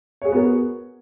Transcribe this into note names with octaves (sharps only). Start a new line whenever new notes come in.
B3 F#4 G#4 A#4 C#5